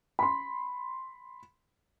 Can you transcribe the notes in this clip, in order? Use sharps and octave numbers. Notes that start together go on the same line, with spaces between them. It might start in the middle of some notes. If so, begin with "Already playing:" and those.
B5 C6